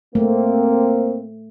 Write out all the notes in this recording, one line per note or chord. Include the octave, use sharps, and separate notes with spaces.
A3 A#3 C4